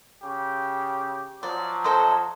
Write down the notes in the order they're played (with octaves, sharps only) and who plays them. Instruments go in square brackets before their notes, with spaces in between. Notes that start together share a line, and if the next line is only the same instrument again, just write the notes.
[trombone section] C#3 G4
[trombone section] F3 F#3 [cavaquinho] D5
[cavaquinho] A4 C5 D#5